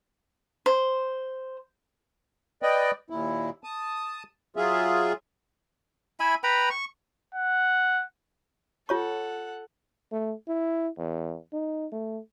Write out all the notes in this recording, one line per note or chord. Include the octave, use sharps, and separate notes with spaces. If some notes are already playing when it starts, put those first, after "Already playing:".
C5
B4 D5 D#5 G5
D#2 A#2 E4
A5 D#6
F#3 F4 G#4 E5
E4 E5 G#5 B5
B4 G5 A#5 B5
C#6
F#5
F4 A4 C#5 F#5 C#6
A3
E4
E2
D#4
A3